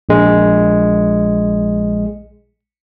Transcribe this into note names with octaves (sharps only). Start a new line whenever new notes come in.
A#1 G#3